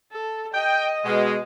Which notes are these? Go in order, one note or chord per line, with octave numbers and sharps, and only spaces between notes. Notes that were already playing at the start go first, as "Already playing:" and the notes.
A4
D#5 G5
B2 G#3